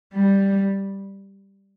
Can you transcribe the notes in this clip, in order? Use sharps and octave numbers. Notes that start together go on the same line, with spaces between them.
G3